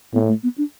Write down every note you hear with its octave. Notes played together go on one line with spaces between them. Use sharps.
A2 B3
A3
B3
D4